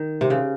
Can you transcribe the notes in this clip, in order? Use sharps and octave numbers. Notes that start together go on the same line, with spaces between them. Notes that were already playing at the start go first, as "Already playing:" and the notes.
Already playing: D#3
C3
C#3